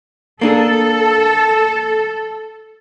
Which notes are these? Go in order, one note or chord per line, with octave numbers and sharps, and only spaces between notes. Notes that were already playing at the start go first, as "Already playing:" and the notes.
A#3 D4 G#4 A4